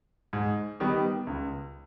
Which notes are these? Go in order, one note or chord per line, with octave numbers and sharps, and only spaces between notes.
G#2
D#3 G3 B3
C#2